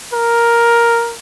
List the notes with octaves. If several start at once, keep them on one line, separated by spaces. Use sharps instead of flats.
A#4